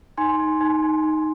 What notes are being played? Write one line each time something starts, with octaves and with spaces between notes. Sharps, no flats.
D#4 G#5 C6
D#4
D#4
D#4
D#4